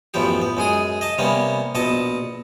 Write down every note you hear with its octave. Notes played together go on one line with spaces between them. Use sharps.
A1 F#2 F3 B3 G4
B3
F#2 G#3 G#4 D#6
D#5 A5
C3 G3 A#3 B3 C#4
A#1 B2 D#5 A5